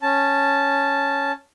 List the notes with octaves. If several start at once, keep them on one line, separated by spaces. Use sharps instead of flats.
C#4 A5